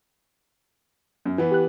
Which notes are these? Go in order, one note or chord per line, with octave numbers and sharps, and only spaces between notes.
F#2
E3 B3
G4 F#6